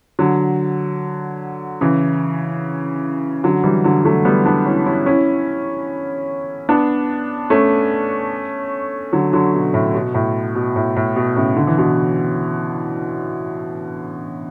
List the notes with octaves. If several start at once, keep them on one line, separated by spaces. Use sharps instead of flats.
D3 F#3
C#3 E3
D3 F#3
E3 G3
D3 F#3
F#3 A3
G3 B3
B3 D4
C#4 E4
C#4 E4
C#4 E4
B3 D4
A3 C#4
D3 F#3
D3 F#3
B2
A2
B2
A2
B2
A2
A2
B2
A2 C#3
D3
E3
B2 D3